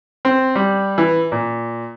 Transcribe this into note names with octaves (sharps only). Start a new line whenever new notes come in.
C4
G3
E3
A#2